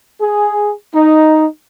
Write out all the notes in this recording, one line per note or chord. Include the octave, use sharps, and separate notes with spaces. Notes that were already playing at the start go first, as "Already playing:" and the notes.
G#4
D#4